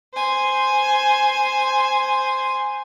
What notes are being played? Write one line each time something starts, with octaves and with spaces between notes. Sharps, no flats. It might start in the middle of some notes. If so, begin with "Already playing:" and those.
C5 G#5